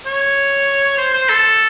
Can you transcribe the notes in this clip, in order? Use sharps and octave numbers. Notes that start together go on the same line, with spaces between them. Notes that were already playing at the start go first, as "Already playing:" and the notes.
C#5
C5
C5
A4